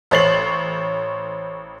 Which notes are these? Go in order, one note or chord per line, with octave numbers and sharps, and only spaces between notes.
A1 C5 C#5 A6 C7 F#7